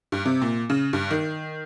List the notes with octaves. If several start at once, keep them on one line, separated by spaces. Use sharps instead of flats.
G2
C3
A#2
C#3
G2
D#3